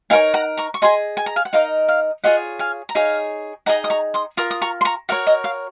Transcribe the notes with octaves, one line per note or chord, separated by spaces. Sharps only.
D#4 A#4 C#5 F5 G#5
F#5 A#5
A#5 C#6
C#6
G#4 D#5 G#5 C6
G#5
A#5
F5 G#5
F#5
D#4 A#4 D#5 F5
F5
F4 G#4 C#5 D#5 F#5
F5 G#5
A#5
D#4 G#4 C#5 F5 G#5
D#4 G#4 D#5 F#5 A#5
D#6
A#5 C#6
C6 D#6
F4 A#4 D#6
D#6
A#5 C#6
C6
A#5 C#6
F#4 A#4 C#5 F5
D#5
F5